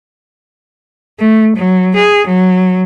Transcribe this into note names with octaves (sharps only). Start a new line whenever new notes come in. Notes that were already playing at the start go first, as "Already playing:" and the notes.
A3
F#3
G#4
F#3